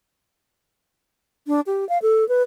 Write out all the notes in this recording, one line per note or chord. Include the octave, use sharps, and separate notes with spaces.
D4
G4
F5
A4
B4